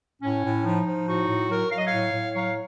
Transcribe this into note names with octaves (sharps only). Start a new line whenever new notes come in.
A2 C#4
A2
F3 D#4
F3
A2 D#4 F#4
A2
F#3 F#4 A#4
F#3 F5
D#5
C#5 F5
A2
A2
F#3 C#5 F5